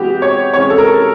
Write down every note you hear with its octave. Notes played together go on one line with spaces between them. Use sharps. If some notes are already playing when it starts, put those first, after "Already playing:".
Already playing: C3 E3 G#3 B3 F#4 G4
C#5
C3 E3 G#3 C#4 C#5
A4
A#4